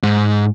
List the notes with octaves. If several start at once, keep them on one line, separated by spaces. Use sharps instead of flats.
G#2